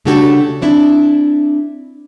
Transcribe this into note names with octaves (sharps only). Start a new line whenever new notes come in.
C#3 A3 D4 F#4 G4 A4
C4 D4 E4